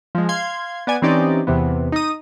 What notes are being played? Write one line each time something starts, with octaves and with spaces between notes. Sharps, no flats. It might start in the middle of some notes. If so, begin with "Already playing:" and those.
F3 G#3
F5 C6 G#6
B3 D5 G#5
E3 C4 C#4 D#4 G4 D5
E2 C3 E3 B3
D#4 D#6